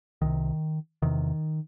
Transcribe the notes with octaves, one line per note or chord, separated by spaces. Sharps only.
C2 C3 D#3
E2 C3 D#3